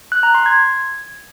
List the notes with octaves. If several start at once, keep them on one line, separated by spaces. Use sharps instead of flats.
F#6
A#5
C6
G#6